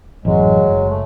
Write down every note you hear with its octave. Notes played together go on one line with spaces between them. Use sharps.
A1 F#2 F#3 G#3
F#1
A3